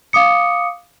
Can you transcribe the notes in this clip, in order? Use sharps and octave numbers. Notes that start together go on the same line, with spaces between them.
F5 D6 D#6 C#7